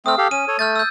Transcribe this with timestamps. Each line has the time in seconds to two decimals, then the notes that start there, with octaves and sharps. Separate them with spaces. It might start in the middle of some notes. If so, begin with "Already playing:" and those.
0.06 A3 C4 D#6 F6
0.18 G4 A4 F5
0.31 C#4 D#7
0.48 A4 C#5
0.59 A3 F6 G6 A6
0.76 E6 G6